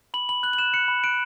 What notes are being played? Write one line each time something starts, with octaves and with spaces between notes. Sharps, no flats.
B5 F#7
B5 F#7
F#6 F#7
F#7
F#6 E7
F#6 C#7
B5
F#6 D7